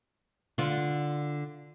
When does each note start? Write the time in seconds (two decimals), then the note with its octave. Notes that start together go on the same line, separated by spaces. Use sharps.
0.58 D3 F4